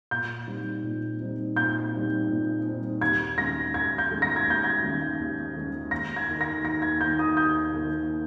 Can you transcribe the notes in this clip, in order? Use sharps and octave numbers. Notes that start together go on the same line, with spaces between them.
A#2 G6
G3 C4 D#4
A#2
G3 C4 D#4
A#2 G6
G3 C4 D#4
A#2
G3 C4 D#4
D#2 G#6
D#3 G#3 C#4 A#6
D#2 G#6
G6
D#3 G#3 C#4
A#6
G#6
D#2 G6
G#6
D#3 G#3 C#4
D#2
D#3 G#3 C#4
D#2 A#6
G#6
D#3 A#3 D#4
A#6
D#2 A#6
G#6
D#3 A#3 D#4 G6
D#6
D#2 G6
D#3 A#3 D#4